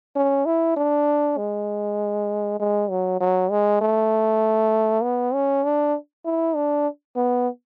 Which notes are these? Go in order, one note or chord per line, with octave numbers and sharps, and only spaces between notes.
C#4
E4
D4
G#3
G#3
F#3
F#3
G#3
A3
B3
C#4
D4
E4
D4
B3